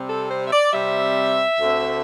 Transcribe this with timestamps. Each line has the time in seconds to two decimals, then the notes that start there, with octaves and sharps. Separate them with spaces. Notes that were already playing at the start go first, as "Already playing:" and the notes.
Already playing: C3 G3 C4
0.09 A4
0.30 C5
0.47 E5
0.51 D5
0.73 C3 G3 C4 E5
1.60 D2 D3 A3 C4